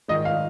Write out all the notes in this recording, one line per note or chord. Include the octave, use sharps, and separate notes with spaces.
G#2 D#3 G#3 D#5
F5